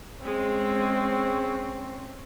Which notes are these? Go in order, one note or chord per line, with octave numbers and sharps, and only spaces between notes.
G#3 C4 C#4